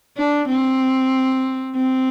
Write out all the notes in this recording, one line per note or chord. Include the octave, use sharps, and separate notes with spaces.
D4
C4
C4